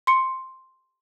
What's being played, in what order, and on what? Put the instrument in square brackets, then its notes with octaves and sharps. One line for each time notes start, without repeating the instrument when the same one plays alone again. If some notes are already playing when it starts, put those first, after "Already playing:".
[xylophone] C6 C#7